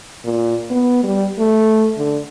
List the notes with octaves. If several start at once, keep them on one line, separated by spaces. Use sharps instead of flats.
A#2
B3
G3
A3
D3